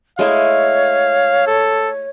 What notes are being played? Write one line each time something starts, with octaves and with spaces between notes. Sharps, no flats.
G#3 A3 E4 C#5 F5
A4